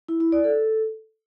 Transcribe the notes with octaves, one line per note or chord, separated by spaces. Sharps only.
E4
E4
D5
A4